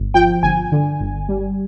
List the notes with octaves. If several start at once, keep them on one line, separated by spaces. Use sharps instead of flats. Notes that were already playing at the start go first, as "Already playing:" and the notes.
Already playing: G1
F3 G5
G1 G#5
D3
G1
G3